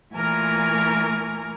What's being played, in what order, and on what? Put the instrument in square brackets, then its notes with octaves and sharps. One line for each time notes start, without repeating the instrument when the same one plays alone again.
[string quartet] A#2 E3 A3 A#4 G#5 A#5